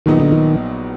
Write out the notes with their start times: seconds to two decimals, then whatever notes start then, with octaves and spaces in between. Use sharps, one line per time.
0.06 A#1 A#2 D#3 F#3 B3 D#4
0.20 D3
0.32 D#3